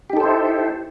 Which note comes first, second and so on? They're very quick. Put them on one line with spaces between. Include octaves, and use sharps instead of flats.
G4 D#4 A4 C5 E4